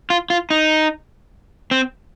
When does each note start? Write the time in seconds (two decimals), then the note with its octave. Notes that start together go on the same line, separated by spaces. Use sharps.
0.10 F4
0.30 F4
0.50 D#4
1.71 C4